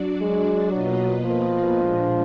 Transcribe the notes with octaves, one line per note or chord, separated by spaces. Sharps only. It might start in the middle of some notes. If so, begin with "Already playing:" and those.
Already playing: F#3 D4 F#4 D5
G#3
B2 F#3 A#3 F4 B4 D#5
F3
A#2 G#3 D4